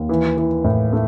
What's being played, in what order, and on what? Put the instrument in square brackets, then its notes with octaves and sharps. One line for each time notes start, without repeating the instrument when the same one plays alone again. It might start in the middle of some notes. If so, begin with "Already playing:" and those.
Already playing: [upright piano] D#2
E3
E3
A2
A3